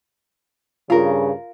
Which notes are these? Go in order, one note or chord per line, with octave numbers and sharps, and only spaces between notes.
G2 C#3 F4 A#4